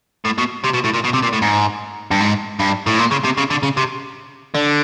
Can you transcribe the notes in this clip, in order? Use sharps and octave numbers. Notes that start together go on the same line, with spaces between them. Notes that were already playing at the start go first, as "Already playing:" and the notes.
A2
B2
C3
B2
A2
A#2
B2
C3
A#2
A2
G#2
G2
G#2
G2
A2
A#2
C#3
C3
C#3
D3
C#3
C3
D3